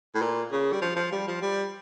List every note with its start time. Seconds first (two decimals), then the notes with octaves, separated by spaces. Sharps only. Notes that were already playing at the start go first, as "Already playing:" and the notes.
0.15 A2
0.22 A#2
0.52 C#3
0.73 G3
0.82 F3
0.96 F3
1.12 G3
1.27 F3
1.41 G3